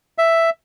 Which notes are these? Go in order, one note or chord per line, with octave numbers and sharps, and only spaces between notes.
E5